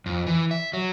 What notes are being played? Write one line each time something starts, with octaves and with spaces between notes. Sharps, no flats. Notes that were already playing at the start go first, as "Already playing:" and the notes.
F2
E3
E5
F#3